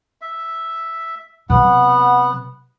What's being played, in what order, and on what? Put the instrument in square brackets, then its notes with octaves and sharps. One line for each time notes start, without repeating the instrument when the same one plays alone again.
[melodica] E5
[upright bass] C3 F#3 [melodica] B3 F#5